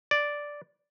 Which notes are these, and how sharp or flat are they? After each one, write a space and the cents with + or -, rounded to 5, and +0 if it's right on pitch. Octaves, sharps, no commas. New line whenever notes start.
D5 -5